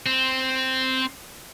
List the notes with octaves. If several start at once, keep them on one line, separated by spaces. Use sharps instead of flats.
C4